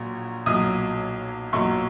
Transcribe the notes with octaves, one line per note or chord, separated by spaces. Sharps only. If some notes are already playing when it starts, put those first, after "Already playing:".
Already playing: A#1 A#2 F#3
B1 A#2 F#3 D#6
B1 A#2 F#3 C#6